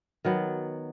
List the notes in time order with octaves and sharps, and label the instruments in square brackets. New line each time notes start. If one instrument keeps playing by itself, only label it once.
[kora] D#3 F#3 B3